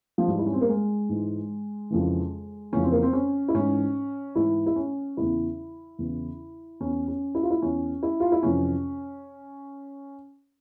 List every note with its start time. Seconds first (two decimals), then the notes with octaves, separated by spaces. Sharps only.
0.18 F3
0.28 G#2 E3 G3
0.39 E4
0.46 C#4
0.53 C4
0.61 A#3
0.69 G#3
1.09 G#2 E3
1.90 F2 C#3 E3
2.72 F2 C#3 E3 C#4
2.83 C4
2.92 A#3
3.02 C4
3.13 C#4
3.48 E4
3.54 G#2 E3 C#4
4.35 G#2 E3 E4
4.66 E4
4.76 C#4
5.17 E2 C#3 E3 E4
5.99 E2 C#3 E3
6.80 E2 E3 C#4
7.08 C#4
7.35 E4
7.43 F4
7.50 E4
7.62 E2 E3 C#4
8.03 E4
8.20 F4
8.32 E4
8.43 F2 C3 E3 C#4